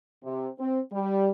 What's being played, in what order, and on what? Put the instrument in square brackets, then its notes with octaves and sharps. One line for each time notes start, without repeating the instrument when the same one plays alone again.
[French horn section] C3
C4
G3